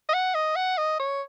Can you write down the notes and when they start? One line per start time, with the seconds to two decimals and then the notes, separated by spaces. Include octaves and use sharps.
0.09 D#5
0.14 F#5
0.35 D#5
0.56 F#5
0.78 D#5
1.00 C#5